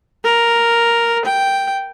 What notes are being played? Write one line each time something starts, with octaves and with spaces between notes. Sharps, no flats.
A#4
G5